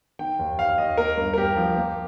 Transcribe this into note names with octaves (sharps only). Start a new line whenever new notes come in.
D#3 G5
D#2
D#2 F5
D#2 D#5
A#3 A#4
G2
A#4
G2 G4
F3
A#3